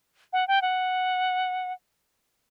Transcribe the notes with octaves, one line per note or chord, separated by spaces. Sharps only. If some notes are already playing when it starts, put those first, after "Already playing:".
F#5
G5
F#5